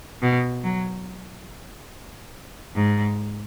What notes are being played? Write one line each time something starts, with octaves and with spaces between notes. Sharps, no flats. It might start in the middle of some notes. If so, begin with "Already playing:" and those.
B2
F#3
G#2